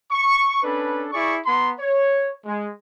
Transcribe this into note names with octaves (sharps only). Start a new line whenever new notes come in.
C#6
C#4 D4 A4 B4 B5
E4 G#4 D5 C#6
B3 A#5 C6
C#5
G#3